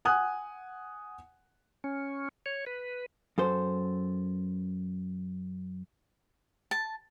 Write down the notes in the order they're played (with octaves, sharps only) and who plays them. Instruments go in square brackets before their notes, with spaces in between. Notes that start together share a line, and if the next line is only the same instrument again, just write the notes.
[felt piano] F#5 G#5 D#6 F#6
[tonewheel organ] C#4
C#5
B4
[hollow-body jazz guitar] F#2 A4 C5
[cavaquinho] A5